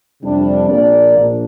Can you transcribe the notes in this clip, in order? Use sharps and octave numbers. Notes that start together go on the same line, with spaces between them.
F2 C3 G3 D4
A#1 A#2 A#3 D4 A#4 D5
A#1 A#2 D4